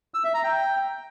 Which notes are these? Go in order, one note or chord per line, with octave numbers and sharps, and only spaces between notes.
E6
E5
A#5
G5